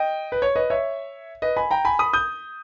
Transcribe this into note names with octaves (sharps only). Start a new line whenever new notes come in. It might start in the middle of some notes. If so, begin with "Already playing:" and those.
Already playing: D#5 G5
B4
C#5
B4 D#5
C#5 E5
B4 D#5
G#5 B5
G5 A#5
G#5 B5
B5 D#6
D#6 G6